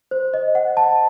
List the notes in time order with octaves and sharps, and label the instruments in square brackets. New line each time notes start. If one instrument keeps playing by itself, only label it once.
[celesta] C5
D#5
F#5
A5